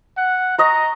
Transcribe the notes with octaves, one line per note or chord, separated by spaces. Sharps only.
F#5
D#5 A#5 C#6